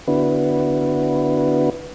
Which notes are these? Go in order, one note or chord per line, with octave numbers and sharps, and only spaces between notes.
D3 B3 D4 E4 F#4 B4